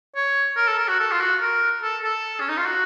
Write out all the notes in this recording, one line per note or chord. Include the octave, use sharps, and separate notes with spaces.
C#5
A#4
A4
A#4
F#4
A4
F4
F#4
A#4
A4
A4
C#4
D#4
F4
F#4